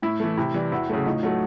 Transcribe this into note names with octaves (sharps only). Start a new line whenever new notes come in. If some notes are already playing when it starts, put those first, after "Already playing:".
A2 E4
E3 A3
C3 E4
E3 G3
E2 E4 F#4
C#3 F#3 A3
A2 D#4 F4
F#3 A3